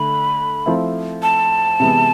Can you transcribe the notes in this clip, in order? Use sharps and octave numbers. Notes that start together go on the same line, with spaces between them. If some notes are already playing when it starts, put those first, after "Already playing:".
Already playing: D3 A3 B5
F3 A3 C4 E4
A5
C3 E3 G#3 B3